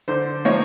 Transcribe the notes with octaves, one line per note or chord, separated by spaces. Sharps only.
D3 C5
F3 A#3 D#4 C#5